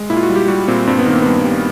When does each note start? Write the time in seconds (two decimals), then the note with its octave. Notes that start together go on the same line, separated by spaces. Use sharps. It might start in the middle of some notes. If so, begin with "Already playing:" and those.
Already playing: G#3
0.10 A#2 E4
0.17 F4
0.23 F#4
0.30 G3
0.36 G4
0.48 G3 F#4
0.68 A#2 C4
0.87 G2 C4
0.99 B3
1.06 D#3 A#3
1.22 G2 B3
1.45 G3